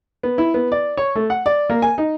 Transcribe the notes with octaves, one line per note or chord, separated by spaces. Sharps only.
B3
E4
B3
D5
C#5
A3
F#5
D5
A#3
G#5
D#4